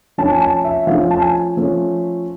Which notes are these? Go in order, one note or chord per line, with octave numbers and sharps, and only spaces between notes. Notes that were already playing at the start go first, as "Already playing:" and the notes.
F3 A3 C#4 A5
G#5
A5
E5
F3 A3 C#4 F5
A5
G#5
F3 A3 C#4